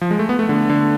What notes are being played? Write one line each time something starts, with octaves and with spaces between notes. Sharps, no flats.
F3
G#3
A3
B3
A3
D3
D3